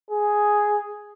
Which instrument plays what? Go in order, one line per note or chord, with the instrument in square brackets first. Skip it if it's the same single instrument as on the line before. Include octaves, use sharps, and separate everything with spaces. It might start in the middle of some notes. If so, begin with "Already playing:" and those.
[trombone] G#4